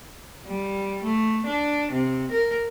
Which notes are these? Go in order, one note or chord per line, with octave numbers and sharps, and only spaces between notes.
G3
A3
D4
C3
A#4